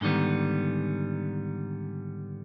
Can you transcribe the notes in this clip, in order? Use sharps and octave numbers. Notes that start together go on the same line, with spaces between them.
G#2 D3 D#3 G3 B3